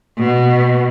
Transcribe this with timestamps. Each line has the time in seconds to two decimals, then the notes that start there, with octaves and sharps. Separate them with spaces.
0.17 B2